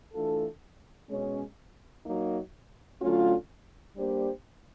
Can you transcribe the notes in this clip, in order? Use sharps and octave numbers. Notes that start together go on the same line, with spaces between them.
E3 A3 D4 F4 A4
B2 G#3 C#4
F#3 A#3 D#4
D3 F#3 A3 C#4 F4
G3 A#3 D4 G4 C5